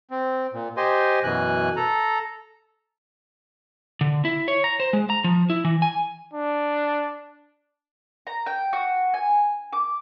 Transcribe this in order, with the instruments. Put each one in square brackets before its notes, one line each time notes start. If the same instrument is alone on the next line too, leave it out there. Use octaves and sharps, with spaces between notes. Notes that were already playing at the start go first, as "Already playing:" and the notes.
[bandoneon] C4
A#2
G4 C5 D#5 G#5 C6
F#2 B2 E3 G#5 F#6
A4 A#5
[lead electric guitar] D3
E4
C#5
A#5
C5
G#3
A#5
F3
E4
E3
G#5
[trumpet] D4
[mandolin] A#5
G5
F#4
G#5
D6